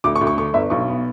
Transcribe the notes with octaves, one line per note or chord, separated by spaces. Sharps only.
D2 D6
C#6
D2
C#6
D3 C#6
G1 E5
B1 C#6
B3